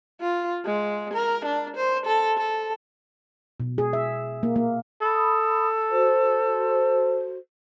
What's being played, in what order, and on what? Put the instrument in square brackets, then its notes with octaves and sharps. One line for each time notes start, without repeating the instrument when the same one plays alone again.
[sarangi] F4
G#3
A#4
D4
C5
A4
A4
[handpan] B2
G#4
E5
A#3
A#3
[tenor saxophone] A4 [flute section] B5 D#6
[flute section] F#4 C5